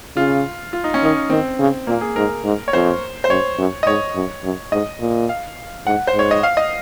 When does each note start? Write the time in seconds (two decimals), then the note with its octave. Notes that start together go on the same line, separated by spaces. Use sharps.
0.16 C#3 F4
0.73 F4
0.84 D#4
0.94 C#4
1.02 D#3 D#4
1.30 D#3 C4
1.59 C#3
1.87 A#2 A#3
2.01 G#4
2.16 G#2 A#4
2.45 G#2
2.68 C#5
2.73 F2 C5
3.24 C5
3.29 F#2 C#5
3.58 F#2
3.83 D#5
3.87 G#2 C#5
4.15 F#2
4.44 F#2
4.72 G#2 D#5
5.00 A#2
5.29 F5
5.86 G#2 F#5
6.07 C5
6.14 G#2
6.19 C#5
6.31 D#5
6.43 F5
6.57 D#5